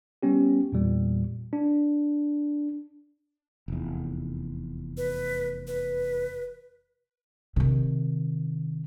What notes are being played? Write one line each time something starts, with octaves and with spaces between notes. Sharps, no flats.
G3 B3 C#4 G4
E2 A#2 G3
D4
F1 E2
B4
B4
C3 D#3